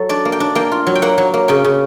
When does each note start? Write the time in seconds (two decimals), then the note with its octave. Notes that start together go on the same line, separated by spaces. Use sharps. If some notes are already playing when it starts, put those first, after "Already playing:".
Already playing: F#3 A4
0.09 D4 D5
0.25 A#3
0.32 G5
0.40 D4
0.55 A#3 G5
0.72 F4
0.87 F#3
0.95 G5
1.02 A#3 F#5
1.18 F#3
1.34 A#3
1.48 C#3 G5
1.64 C#3